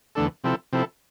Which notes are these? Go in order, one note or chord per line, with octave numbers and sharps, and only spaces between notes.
E2 D3 A3 D4 A4
C3 F3 C4 E4 A4
C3 F3 C4 E4 A4